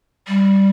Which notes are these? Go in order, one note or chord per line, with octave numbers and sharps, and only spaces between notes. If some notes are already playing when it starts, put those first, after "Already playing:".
G3